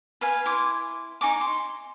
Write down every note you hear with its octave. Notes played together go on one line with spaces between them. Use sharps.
B4 F5 G#5
E4 C6 D6
D#4 G#5 C#6 D6
C6